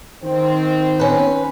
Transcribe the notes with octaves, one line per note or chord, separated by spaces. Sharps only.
D#3 C4
C#4 B4